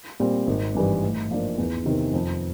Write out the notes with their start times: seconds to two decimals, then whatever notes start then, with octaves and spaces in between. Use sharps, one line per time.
0.20 A#2 G3 C4
0.47 G#1
0.75 G2 E3 G3
1.02 A2
1.31 F3 A#3 D4 F4
1.58 E2
1.86 C3 D#3
2.14 F2